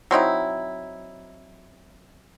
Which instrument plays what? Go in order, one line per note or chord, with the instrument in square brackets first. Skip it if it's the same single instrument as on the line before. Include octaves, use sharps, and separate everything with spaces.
[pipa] F#3 C4 D#4 E4